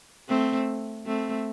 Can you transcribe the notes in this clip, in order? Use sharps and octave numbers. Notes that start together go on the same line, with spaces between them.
A3 C4
A3 C4